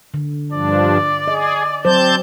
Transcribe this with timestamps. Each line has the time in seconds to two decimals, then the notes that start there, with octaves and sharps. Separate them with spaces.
0.14 D3
0.52 G2 F3 D4 D5
1.28 G#4 D#5
1.85 F#3 C4 C5 A5 G6